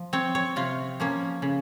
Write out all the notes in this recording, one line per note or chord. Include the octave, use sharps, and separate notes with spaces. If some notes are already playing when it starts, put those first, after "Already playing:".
Already playing: F3
C4 C#5
C#5
C3 F4
F3 A#3 C#4
C#3